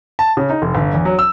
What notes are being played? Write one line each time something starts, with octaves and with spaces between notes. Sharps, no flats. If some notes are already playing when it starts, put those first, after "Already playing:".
A5
C#3
D#4
F1
G1
E2
F#3
E6